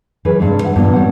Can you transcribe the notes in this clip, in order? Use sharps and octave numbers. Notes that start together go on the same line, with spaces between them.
F#2 E3 G#4 B4
G2 C3 G#3
E3 E5 F#5
E2 G2 A#2 E3 B3
G3 C4 C#4 F#5